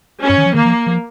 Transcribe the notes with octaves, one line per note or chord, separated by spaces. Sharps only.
C#4
G2
D#3
F3
D#3 A#3
F3
F3